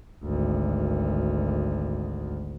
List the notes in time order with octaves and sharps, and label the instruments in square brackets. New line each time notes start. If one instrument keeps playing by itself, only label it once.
[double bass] G#1 D2